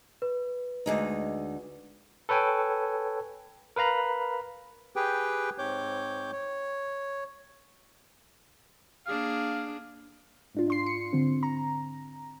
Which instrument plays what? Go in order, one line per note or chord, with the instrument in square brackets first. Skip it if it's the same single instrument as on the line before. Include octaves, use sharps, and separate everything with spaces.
[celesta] B4
[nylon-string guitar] D2 G#3 D#4
[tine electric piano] A4 B4 C#5 G5 G#5
A#4 B4 F5 A#5 B5
[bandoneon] G4 G#4 B4 G5
G#2 C4 C#5 D6 G6
C#5
[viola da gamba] A#3 D4 G#4 [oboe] F5
[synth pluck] G#2 D4 F4
D4 C6 C7
C#7
D3 C4
A#5